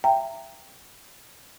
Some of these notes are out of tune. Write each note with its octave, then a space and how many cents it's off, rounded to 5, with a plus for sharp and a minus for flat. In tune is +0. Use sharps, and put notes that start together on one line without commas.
E5 +25 G5 +5 A#5 -20